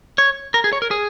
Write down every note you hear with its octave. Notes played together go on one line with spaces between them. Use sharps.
C#5
A#4
G#4
C#5
A#4
G#4